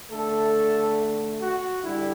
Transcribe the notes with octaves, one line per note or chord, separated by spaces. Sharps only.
D3 A3 A4
F#4
D3 G3 E4